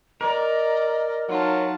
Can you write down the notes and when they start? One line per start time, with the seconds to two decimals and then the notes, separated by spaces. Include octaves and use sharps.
0.21 A#4 D5 D#5
1.29 F#3 D#4 F4 A5